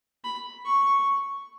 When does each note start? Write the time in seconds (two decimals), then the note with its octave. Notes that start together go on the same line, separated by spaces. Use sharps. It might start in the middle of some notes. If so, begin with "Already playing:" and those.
0.24 B5
0.65 C#6